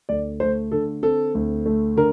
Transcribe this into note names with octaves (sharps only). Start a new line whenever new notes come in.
D2 D5
A3 C5
D3 A4
C4 A4
D2
A3
D3 A#4